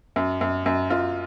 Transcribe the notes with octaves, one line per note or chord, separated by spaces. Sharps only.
F#2
F#2
F#2
F#2 F4